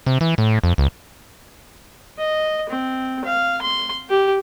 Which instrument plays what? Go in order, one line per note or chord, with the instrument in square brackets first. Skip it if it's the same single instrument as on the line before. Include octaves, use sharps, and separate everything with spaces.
[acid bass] C3
E3
A2
F2
C#2
[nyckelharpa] D#5
C4
F5
C6
G4